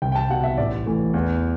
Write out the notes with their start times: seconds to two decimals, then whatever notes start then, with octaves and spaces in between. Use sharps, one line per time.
0.02 C2 G5
0.12 G5
0.15 A5
0.30 B2 G3 F#5
0.44 E5
0.58 A1 D5
0.86 A2 E3 A3
1.14 E2